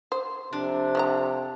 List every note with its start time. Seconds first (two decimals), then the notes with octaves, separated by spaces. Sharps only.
0.12 C5
0.53 F2 C3 D4
0.95 F3 C#5 A#5